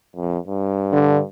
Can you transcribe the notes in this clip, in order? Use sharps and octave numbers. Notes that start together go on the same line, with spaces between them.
F2
G2
D3